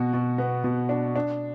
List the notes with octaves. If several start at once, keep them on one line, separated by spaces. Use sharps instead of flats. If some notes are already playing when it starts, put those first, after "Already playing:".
Already playing: B2 F#4
B2
B3
B2
D4
D4